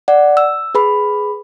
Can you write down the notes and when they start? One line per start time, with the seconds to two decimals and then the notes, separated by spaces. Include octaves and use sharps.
0.08 D5 F#5
0.37 E6
0.75 G#4 B4 B5